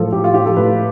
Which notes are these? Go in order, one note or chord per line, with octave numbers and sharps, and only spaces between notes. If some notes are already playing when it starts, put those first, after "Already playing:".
Already playing: A2 F3 A4
A2 G4
F4
F3 G4
A4
A2 B4